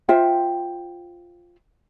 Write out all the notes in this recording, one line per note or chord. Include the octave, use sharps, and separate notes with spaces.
F4 C5 E5 G5